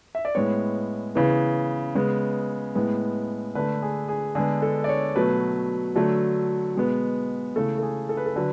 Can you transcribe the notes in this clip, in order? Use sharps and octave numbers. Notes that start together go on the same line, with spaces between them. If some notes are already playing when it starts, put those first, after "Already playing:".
E5
D5
A2 G#3 B3 C#5
C#3 E3 B3
C#3 G#3 B3
A2 G#3 B3
D3 A3 B4
G#4
G#4
D3 G#3 B3 G#4
A4
D5
C#5
B2 F#3 A3 B4
D3 F#3 A3
B2 G#3 B3
C#3 E3 A3 A4
A4
G#4
A4
B4
A4
D3 F#3 B4